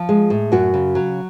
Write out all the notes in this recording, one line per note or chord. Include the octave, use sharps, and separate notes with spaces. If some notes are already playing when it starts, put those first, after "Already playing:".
Already playing: F3
G#3
A2
F#2 F#4
C#3
F#3